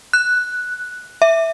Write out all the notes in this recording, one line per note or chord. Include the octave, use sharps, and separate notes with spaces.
F#6
E5